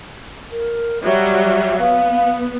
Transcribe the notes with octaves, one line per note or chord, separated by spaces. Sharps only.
A#4
F#3 G3 E5
B3 F5